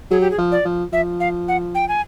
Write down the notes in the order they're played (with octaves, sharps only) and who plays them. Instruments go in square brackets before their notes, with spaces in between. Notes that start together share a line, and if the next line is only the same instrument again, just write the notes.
[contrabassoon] F#3 [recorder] G#4
[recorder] G4
G#4
[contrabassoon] F3
[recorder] D5
[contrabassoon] F3
[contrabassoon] F3 [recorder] E5
[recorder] F5
F#5
G5
G#5